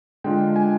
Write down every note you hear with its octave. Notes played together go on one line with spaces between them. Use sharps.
D3 G#3 D4 F4 G5
G#5